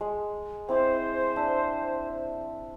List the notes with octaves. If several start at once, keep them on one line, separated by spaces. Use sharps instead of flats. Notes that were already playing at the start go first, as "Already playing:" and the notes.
G#3
C4 E4 C5 D6
D4 E5